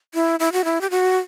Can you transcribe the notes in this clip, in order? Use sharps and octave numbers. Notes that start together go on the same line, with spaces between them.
E4
E4
F#4
E4
G4
F#4